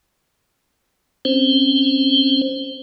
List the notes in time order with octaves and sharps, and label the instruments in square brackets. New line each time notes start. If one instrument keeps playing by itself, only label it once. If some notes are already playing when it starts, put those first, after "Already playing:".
[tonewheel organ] C4 C#4 C5